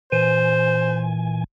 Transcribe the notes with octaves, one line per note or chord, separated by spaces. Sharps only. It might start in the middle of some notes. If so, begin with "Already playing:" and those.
A#2 E3 C5 G#5